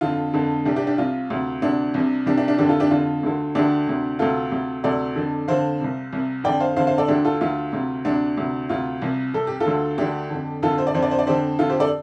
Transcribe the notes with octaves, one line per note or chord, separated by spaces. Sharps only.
F2 D3 F4
F2 D3
C2 C3 D4 G4
D4 G4
D4 G4
C2 C3 F4
D2 C3
D2 C3 D4
C2 C3
C2 C3 D4 G4
D4 G4
D4 G4
F2 D3 D4 G4
F4 A4
D4 G4
F2 D3 F4
D2 D3
D2 D3 D4 G4
D2 C3
D2 C3 F4 A4
D2 C3
D2 C3 A4 D5
F2 D3
F2 D3 C5 F5
C2 C3
C2 C3
F2 D3 D5 G5
C5 F5
F2 D3 C5 F5
C5 F5
A4 D5
D2 D3 D4 G4
F4 A4
D2 D3 F4
D2 C3
D2 C3 D4
D2 C3
D2 C3 F4
C2 C3
C2 C3 A4
G4
F4 A4
D2 D3
D2 D3 D4 G4
F2 D3
F2 D3 F4 A4
C5
D5
F2 D3 C5
D5
C5
D5
F2 D3 G4 C5
F2 D3 F4 A4
G4 C5
A4 D5